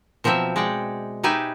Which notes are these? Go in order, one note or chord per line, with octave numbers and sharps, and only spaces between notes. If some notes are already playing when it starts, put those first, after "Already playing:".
B2 F3 F#3 C4 E5
G#3 D5 F#5 G5
D#4 G4 B4 E5 G#5